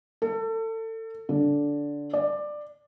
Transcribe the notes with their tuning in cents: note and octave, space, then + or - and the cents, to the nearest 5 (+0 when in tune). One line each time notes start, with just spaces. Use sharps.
A4 +30
D3 -10
D5 +15